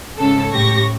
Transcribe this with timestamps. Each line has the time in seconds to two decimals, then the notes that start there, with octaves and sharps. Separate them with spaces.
0.17 G#2 C#3 A4
0.52 A2 G4 C#6 A#6